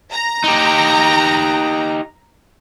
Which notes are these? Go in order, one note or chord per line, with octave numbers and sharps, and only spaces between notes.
A#5
D#4 G4